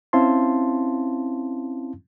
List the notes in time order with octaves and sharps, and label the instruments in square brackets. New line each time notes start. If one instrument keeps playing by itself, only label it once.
[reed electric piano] C4 C#4 E4 F5 A5 C6